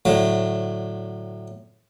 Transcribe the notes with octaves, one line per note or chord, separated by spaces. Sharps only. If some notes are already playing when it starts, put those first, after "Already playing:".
A2 D3 F#3